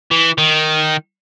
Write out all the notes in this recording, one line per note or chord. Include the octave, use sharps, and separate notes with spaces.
E3
D#3